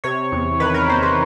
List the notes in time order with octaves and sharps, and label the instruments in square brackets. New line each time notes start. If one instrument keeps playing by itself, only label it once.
[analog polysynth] C3 C#5
E2
D#3 B4
A#4
E2 C5
B4